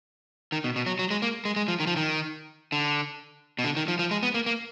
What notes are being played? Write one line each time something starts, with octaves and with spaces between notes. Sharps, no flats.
D#3
B2
B2
F#3
F#3
G#3
A#3
G#3
G#3
F3
D#3
F3
D#3
D3
B2
D3
D#3
F3
F3
G#3
B3
A#3
A#3